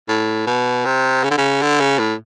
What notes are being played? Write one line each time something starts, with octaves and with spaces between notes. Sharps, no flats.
A2
B2
C3
C#3
D3
C#3
D3
C#3
A2